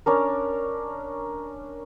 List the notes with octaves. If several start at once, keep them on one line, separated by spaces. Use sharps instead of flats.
C#4 D4 A#4